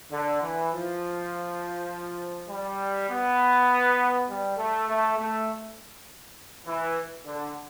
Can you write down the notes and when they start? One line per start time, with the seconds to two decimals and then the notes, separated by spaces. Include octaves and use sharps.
0.11 D3
0.41 E3
0.72 F3
2.49 G3
3.10 B3
4.28 G3
4.57 A3
4.88 A3
5.18 A3
6.66 E3
7.26 D3